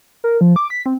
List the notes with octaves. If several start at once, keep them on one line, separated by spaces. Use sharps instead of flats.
A#4
F3
D6
B6
C4